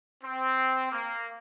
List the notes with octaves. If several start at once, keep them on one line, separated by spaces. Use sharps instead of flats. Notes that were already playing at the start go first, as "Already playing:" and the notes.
C4
A#3